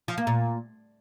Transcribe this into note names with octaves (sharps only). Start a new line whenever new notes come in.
F3
A#3
A#2